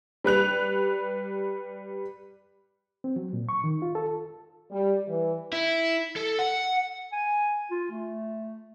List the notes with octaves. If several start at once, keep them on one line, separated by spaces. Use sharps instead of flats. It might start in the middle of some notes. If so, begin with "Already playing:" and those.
G3 B4 F#6 F7
C4
F#3
A#2
C#6
D#3
F4
A4
G3
E3
E4
A4
F#5
G#5
F4
A3